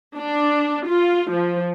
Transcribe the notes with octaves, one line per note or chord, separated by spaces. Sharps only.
D4
F4
F3